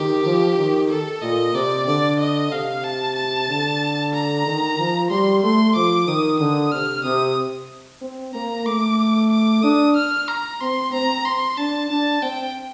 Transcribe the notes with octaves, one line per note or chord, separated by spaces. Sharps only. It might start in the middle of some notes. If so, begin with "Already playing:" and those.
Already playing: D#3 G4
F3
D#3
A4
A#2 D#5
C3 D5
D3 D5
D#5
C3 F5
A5
A5
D3
A#5
D#3
F3
G3 C6
A3 C6
F3 D6
D#3 D#6
D3 D#6
C3 F6
C3 D#6
C4
A#3 A#5
A3 D6
D6
D4 D#6
F6
A#5
C4 C6
C4 A#5
C6
D4 A5
D4 A5
C4 G5